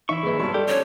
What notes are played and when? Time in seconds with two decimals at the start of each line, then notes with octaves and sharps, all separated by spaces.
0.09 E3 D#4 E4 E5 C#6
0.23 A#1 D#2 G#4 B4
0.39 G2 B2 F#3 A5 C6
0.54 G3 G4 A4 D5
0.68 C#4 D4 C5 C#5